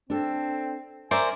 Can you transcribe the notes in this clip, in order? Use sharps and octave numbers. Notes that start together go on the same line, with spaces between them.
C4 D4 A4
C#4 A#4 C5 D5 E5 G#5